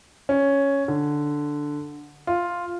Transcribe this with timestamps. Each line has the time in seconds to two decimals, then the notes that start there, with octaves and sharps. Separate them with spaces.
0.29 C#4
0.88 D3
2.27 F4